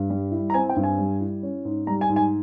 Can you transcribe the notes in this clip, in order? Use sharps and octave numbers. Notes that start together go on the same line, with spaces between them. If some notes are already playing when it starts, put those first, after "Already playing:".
Already playing: G2
G3
E4
A#5
C4 G#5
G5
G2
G#5
G3
E4
C#4
G#2
G3 A#5
G#5
G#2
G#5